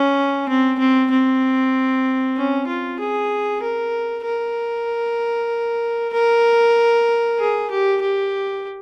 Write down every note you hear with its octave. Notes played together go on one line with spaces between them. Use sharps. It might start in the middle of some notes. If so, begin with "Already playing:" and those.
Already playing: C#4
C4
C4
C4
C#4
F4
G#4
A#4
A#4
A#4
G#4
G4
G4